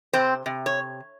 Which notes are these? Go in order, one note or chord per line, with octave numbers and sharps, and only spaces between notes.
C3 C4 C5
C3
C#5